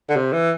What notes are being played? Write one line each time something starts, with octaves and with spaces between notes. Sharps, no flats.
D3
C3
E3